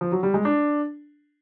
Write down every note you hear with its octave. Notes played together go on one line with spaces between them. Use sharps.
F3
F#3
G3
G#3
D4